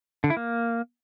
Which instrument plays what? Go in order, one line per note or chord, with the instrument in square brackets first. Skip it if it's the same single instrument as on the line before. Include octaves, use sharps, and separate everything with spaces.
[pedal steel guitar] D3
E4
A#3